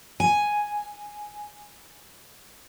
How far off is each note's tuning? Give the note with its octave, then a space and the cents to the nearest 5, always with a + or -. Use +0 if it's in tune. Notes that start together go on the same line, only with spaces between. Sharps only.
G#5 +0